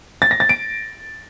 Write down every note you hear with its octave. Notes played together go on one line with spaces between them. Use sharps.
A6
A#6
A6
D7